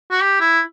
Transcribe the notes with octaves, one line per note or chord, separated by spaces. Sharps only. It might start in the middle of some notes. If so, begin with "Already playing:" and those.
F#4
G4
E4